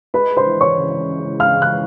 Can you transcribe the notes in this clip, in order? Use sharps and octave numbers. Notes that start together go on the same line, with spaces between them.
G#3 B4 B5
C5 C6
E3
C#5 C#6
C#3
C#3
G#3 F5 F6
F#6
E3